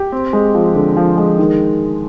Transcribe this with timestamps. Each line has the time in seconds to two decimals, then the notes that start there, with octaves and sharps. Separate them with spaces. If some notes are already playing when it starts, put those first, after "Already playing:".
Already playing: G4
0.12 C4
0.33 G#3
0.55 F3
0.75 D3
0.97 F3
1.17 G#3
1.38 D#3